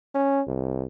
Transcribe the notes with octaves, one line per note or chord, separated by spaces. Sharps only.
C#4
C2